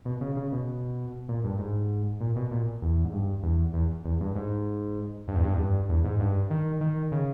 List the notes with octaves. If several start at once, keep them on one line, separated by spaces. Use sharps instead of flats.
B2
C#3
C#3
B2
A#2
G2
G#2
A#2
B2
A#2
E2
G#2
G2
E2
E2
E2
G2
G#2
G2
E2
G2
E2
G2
E2
G#2
G2
D#3
D#3
C#3